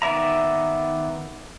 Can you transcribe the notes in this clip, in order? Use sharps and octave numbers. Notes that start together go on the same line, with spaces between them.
D#3 B3 D5 E5 A#5